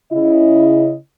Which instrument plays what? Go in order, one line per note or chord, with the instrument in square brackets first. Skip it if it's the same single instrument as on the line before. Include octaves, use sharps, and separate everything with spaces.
[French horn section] C#3 E4 D#5